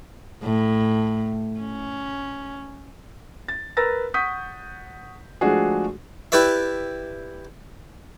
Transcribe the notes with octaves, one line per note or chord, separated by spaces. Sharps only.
A2
C#4
A6
A#4 B4 A#5 E6 A6 A#6
F#5 C#6 D#6 G6 B6
F3 G#3 A3 D4 F#4 G#4
E4 G4 B4 D5 E5